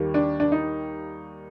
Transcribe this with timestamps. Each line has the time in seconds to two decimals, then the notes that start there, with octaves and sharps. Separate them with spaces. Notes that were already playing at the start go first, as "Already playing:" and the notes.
Already playing: D#2 D#3 G3 A#3
0.14 D4
0.40 D4
0.52 D#4